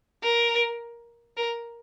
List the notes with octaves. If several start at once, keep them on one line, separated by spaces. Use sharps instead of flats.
A#4
A#4